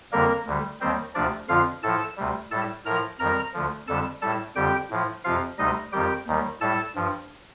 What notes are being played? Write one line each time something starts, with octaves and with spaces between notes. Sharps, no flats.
F2 D3 G3 A#3 A#4
D2 D3 G3
D#2 D#3 G3 C4 C5
D2 C3 F3 D4 D5
F2 D3 F3 F4 F5
A2 F3 A4 A5
D2 C3 G3
A2 G3 A4 A5
A2 F3 A#4 A#5
F2 D#3 G3 A#4 A#5
D2 D3 F3
F2 D3 G3 A4 A5
A2 G3 A4 A5
F2 D3 G3 G4 G5
A2 F3
F2 C3 F3 F4 F5
D2 C3 G3 D#4 D#5
F2 D#3 G3 G4 G5
D#2 D#3 G3
A2 G3 A4 A5
G2 F3